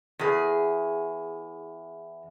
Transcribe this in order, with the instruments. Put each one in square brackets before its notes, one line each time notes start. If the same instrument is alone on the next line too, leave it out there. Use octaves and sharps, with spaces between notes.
[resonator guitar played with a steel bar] E2 G#4